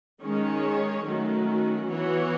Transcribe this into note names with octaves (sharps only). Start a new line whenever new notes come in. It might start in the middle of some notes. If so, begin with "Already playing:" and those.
D#3 G#3 C#4 G#4 C#5
D#3 F#3 A3 C#4 F#4
E3 B3 F#4 C#5